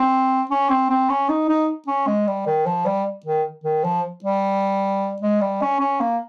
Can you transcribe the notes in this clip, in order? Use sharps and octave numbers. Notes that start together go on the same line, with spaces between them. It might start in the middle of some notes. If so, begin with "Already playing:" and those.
Already playing: C4
C#4
C4
C4
C#4
D#4
D#4
C#4
G#3
G3
D#3
F3
G3
D#3
D#3
F3
G3
G#3
G3
C#4
C#4
A#3